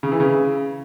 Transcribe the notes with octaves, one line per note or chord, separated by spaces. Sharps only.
C#3
E3
C#3